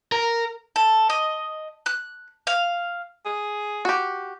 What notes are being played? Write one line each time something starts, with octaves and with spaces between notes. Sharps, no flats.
A#4
A4
D#5
F#6
F5
G#4
F#4 G4